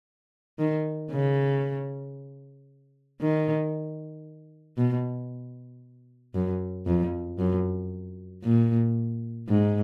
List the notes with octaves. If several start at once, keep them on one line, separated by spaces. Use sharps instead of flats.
D#3
C#3
D#3
B2
F#2
F2
F#2
A#2
G#2